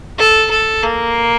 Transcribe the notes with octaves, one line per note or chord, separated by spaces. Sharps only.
A4
A4
A#3